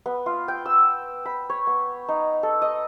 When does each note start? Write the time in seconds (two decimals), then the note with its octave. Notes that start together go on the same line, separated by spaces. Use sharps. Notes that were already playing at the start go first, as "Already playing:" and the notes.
0.06 B3
0.26 F4
0.48 G5
0.66 E6
1.25 B5
1.50 C#5
1.67 B3
2.09 D#4
2.43 A4
2.62 D#5